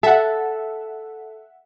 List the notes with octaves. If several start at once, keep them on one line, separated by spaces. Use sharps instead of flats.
A4 E5 F#5